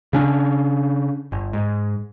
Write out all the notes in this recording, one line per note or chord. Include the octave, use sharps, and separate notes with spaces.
C#3 C#4 D4
G1
G#2